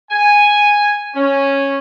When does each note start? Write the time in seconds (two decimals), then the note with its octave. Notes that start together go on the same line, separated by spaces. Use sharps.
0.11 G#5
1.15 C#4